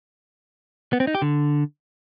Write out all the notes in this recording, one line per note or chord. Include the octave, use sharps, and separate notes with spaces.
B3
C4
D#4
G4
D3